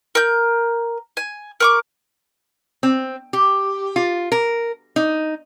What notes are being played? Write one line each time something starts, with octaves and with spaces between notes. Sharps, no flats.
A#4 G6
G#5
A#4 C#6 D6
C4
G4
F4
A#4
D#4